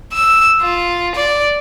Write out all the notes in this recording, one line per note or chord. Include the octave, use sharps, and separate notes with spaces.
E6
F4
D5